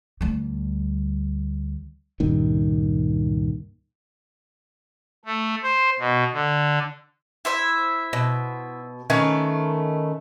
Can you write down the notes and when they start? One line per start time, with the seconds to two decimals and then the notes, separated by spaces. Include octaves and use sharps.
0.21 D2 G3
2.20 C#2 G2 A#2 D#3
5.25 A3
5.63 C5
5.99 B2
6.33 D3
7.45 E4 C5 E5
8.13 B2
9.10 D#3 A3 C#4 B4